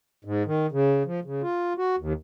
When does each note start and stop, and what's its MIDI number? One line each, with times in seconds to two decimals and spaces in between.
0.25 0.43 44
0.46 0.66 51
0.72 1.03 49
1.05 1.20 53
1.25 1.42 49
1.42 1.73 65
1.78 1.96 66
1.99 2.13 39